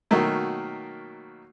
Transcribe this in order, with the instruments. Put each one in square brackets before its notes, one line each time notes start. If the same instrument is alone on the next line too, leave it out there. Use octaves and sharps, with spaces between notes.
[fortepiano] B2 D#3 F#3 A3 A#3